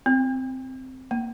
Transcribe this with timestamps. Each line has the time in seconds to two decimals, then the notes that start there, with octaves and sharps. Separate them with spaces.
0.06 C4
1.11 A#3